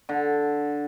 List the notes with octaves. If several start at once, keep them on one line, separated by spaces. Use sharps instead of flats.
D3